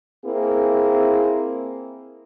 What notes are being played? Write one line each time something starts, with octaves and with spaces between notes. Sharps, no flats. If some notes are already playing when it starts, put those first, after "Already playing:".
A#3 C4 E4 G#4